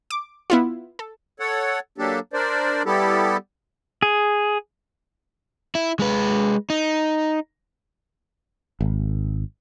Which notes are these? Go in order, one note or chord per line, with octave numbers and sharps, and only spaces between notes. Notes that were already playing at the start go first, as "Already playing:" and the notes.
D6
B3 E4 F4
A4
A4 C#5 F#5
F#3 A#3 D4 G4 A4
D4 A#4 C5 D5
G3 B3 E4 G4 A4
G#4
E4
G#3 B4
D#4
G#1